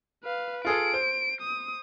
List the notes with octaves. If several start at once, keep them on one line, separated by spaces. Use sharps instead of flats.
B4 F5
F4 G#4 A4 D7
C5
D#6